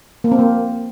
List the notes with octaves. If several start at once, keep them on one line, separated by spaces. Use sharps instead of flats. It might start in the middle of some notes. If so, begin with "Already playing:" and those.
A#3
C4
A#3